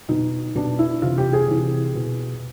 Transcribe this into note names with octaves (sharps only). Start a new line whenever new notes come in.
B2 D#4
B2 D4
E4
C3 E3 F4
G4
G#4
C3 E3
B2